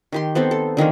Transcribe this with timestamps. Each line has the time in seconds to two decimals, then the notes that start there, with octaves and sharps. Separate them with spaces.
0.12 D#3 G4 C6
0.35 B3 C4 A4 C5
0.51 A4
0.77 D3 D#3 G#3 A#3